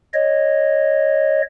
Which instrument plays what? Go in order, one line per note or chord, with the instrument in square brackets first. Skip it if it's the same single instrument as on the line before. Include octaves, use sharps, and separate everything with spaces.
[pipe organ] C#5 D#5